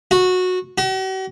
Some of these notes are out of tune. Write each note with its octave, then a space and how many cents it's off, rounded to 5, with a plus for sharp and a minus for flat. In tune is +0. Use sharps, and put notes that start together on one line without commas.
F#4 -15
F#4 +45